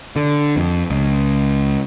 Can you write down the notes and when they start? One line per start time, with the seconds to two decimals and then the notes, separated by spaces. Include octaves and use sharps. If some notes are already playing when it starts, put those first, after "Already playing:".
0.16 D3
0.57 F2
0.90 C#2